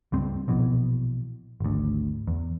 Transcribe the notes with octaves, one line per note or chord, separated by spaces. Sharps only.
C#2 G2 C4
A#1 B2 E3
G#1 D2
E2